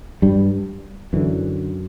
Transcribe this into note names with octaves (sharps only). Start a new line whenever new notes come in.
G2 G3
F#2 D3 E3